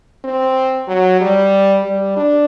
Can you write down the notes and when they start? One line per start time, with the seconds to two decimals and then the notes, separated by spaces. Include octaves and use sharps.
0.25 C4
0.88 F#3
1.21 G3
1.84 G3
2.17 D4